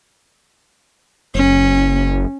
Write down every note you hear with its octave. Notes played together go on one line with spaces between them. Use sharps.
F#1 C#4